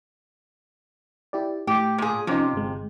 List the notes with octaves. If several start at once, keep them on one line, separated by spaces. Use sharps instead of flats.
E4 G4 D5
A2 G4
A#2 G#4
F2 C3 F3 C#4 D#4
G1 G#3